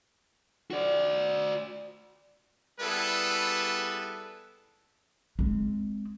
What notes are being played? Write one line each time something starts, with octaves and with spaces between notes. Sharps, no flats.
F#4 D5
G3 B3 E4 G#4 A4 B4
G#3 C4